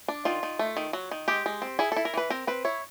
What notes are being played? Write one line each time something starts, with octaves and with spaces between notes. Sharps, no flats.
D4
D#3 F4
D#3
A3
D#3
F#3
D#3
G#3 G4
G#3
C4
E4 G#4
E4 A4
A#4
E3 B4
C4 A#4
C4 B4
E4 C#5